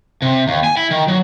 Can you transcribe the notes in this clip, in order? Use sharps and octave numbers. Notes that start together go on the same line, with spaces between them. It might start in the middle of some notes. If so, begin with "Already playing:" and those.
C3
D#2
G#5
E4
D#3
F#3